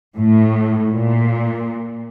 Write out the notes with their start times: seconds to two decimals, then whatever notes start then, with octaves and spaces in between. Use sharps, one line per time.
0.17 A2
0.93 A#2